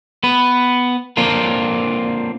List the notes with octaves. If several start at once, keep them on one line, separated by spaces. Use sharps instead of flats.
B3 B4
A#3 C4 D4 F4 A#4